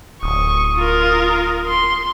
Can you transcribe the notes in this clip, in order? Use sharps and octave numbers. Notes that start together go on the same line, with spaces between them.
D1 C#6 D#6
F4 A#4
C6